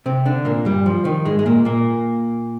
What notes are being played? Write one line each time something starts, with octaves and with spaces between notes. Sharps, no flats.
C3 C4
D3 D4
A#2 A#3
G2 G3
F3
D#3
G#2 G#3
G#3
A#2 A#3
A#2 A#3